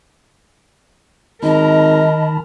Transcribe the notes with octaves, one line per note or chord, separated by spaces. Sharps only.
G#1 D#3 A#4 D#5 A5 B5